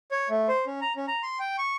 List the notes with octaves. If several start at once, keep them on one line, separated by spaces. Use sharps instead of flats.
C#5
A3
C5
C#4
A#5
C#4
A#5
C6
G5
C#6